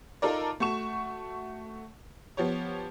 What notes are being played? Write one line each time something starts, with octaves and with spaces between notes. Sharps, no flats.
D#4 F4 A4 A#4 D5
A3 F#4 C#6 E7
F3 B3 G4 C#5